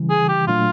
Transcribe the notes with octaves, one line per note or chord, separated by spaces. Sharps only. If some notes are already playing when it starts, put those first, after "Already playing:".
Already playing: C#3 E3 G3
G#4
G4
A#2 F#3 A3 D4 F4